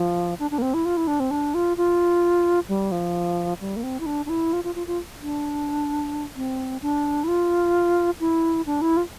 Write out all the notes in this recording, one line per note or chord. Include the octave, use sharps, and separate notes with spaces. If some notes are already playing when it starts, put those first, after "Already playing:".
Already playing: F3
D4
D4
A#3
C4
E4
F4
E4
D4
C4
D4
F4
F4
G3
F3
G3
A#3
C4
E4
D4
D4
E4
F4
F4
F4
F4
D4
C4
D4
E4
F4
E4
D4
E4
F4